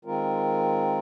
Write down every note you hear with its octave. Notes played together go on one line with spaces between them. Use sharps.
D#3 G#3 C4 F4 A#4